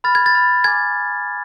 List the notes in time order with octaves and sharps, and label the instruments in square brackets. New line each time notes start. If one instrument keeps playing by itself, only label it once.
[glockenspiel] B5 F6 A6
G#6
A6
B5 F6
G#5 B5 D6 G#6